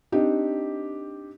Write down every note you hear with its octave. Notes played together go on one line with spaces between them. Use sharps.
C4 D4 D#4 G4